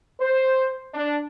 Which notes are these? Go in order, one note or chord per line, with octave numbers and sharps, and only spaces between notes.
C5
D4